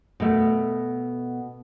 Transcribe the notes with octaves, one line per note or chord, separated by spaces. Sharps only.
B2 A3